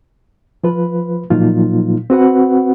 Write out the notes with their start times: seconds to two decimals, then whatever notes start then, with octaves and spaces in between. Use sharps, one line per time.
0.64 F3 F4 B4
1.30 A#2 F3 F#3 A#3 D#4 F4
2.10 C4 F#4 B4 F#5